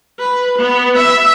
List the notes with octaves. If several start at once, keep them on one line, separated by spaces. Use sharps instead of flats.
B4
B3
E5